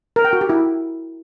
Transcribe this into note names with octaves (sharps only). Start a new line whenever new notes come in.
A#4
G5
F#4
G4
E4